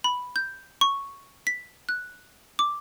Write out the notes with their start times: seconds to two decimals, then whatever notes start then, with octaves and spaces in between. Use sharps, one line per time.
0.04 B5
0.36 G6
0.81 C#6
1.47 B6
1.89 F#6
2.59 D6